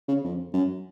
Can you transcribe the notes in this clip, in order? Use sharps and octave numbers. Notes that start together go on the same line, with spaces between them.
C#3
F2
F#2